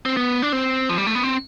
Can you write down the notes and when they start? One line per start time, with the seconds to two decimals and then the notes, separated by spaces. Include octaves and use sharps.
0.06 C4
0.17 B3
0.42 D4
0.52 C4
0.89 F3
0.98 G3
1.07 A3
1.15 B3
1.23 C4